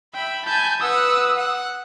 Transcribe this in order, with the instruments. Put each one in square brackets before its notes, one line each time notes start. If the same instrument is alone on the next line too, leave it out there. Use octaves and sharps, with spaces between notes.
[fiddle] E5 B5 [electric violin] G5
[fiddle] G#5 B5 [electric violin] A5 G6
[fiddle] B4 F#5 [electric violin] D#6 E6
[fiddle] F#5